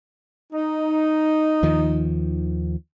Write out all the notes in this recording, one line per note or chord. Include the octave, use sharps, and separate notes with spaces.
D#4
D#2 D#3 F3